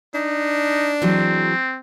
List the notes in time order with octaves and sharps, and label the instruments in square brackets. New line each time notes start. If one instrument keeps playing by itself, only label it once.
[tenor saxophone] D4 [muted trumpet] D#4
[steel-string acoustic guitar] E3 F#3 G#3 [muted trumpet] C4